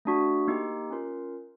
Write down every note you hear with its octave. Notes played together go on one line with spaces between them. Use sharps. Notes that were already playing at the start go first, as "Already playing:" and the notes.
A3 D4 F#4
A#3 D#4 G4
C#4 F4 A#4